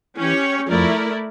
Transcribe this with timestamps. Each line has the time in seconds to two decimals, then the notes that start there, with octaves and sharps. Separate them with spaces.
0.16 E3 C#4 G4 C#5
0.68 F2 F3 A3 E4 A#4 D5